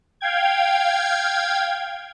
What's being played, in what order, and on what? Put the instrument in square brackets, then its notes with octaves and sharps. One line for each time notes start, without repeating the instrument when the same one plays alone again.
[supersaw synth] F5 G5 G#6